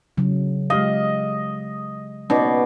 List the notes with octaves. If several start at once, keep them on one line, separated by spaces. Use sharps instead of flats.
C#3 F#3
G#3 G4 D#5 F5
B2 C#4 D#4 D5